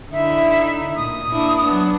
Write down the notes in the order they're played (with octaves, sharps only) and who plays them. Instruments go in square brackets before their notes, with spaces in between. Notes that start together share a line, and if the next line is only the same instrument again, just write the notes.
[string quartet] D3 D#4 E4 [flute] E5
[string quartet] A#2 [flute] D#6
[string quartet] A#3 D4 E4
F#3 B3 D4